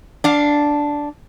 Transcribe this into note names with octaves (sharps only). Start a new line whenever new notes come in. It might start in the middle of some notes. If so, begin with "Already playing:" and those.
D4 F5